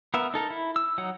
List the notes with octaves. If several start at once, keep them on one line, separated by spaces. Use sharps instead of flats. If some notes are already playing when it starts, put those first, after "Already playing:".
B3 A#4 E5
D#4 A4 A#4
E4
E6
F#3 D#4 F#5